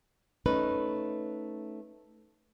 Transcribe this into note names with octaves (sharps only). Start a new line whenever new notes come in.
A3 C#4 D#4 B4